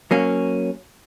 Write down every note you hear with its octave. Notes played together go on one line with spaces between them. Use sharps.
F#3 A#3 C#4